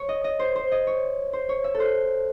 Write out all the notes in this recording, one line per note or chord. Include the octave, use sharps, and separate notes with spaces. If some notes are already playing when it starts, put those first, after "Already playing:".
Already playing: C#5
D#5
D#5
C5
C5
D#5
C#5
C5
C#5
E5
A4
C5